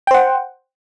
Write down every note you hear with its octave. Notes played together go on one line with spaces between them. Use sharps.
C5 F#5 G5